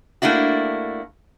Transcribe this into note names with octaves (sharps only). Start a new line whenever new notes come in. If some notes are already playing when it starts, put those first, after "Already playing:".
A3 A#3 D4 E4 F#4